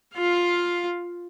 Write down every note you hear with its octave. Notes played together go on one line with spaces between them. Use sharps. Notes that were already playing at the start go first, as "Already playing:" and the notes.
F4 F5